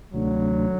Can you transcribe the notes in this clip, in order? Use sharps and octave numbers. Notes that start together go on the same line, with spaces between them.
D2 C3 D#3 F#3 A3 D4